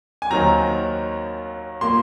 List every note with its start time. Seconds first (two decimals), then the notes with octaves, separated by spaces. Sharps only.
0.22 G#5
0.30 D#2 D#3 F#3 C4 A#5
1.81 F3 A#3 C6